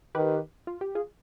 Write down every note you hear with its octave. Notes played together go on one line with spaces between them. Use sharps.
D#3 G4 B4
F4
G4
F4 G#4